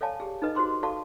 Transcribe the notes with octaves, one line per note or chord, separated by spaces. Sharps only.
A4 C#5 D5 F5 G#5 A5
G4 G#4
D#4 A4 B4 D#5
F#4 G#4 C5 C6 D6
F#4 A4 D5 F5 A5 C#6